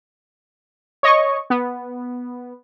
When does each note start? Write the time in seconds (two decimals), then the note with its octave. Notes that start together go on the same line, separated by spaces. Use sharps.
1.03 C#5 D#5 C#6
1.50 B3